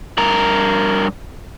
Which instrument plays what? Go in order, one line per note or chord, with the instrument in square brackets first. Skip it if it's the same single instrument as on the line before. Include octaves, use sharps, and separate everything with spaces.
[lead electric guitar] G2 A#4